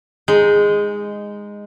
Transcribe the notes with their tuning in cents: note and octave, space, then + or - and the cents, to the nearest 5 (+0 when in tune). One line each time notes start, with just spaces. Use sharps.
G#3 -10 D#4 +0